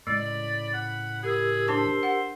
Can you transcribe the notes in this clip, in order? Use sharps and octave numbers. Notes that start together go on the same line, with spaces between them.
A2 C#3 G#3 D5 B5
F#5
G4 G#4 A#4 E6
D4 C5 A5 D6
F#5